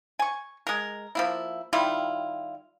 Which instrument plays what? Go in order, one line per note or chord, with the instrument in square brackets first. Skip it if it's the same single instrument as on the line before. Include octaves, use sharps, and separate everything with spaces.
[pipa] G#5 C#6
G#3 A#4
F3 A#3 E4
D#3 G3 E4 F4